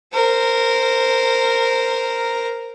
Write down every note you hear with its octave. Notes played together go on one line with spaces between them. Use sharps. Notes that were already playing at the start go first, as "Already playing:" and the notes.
A#4 C5